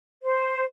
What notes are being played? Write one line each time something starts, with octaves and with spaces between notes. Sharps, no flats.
C5